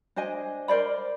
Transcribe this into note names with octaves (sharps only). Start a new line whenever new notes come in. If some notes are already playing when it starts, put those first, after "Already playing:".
D4 C5 D#5 G#5
A#4 C5 D5 B5